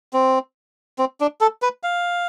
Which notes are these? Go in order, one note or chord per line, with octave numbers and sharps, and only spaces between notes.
C4
C4
D4
A4
B4
F5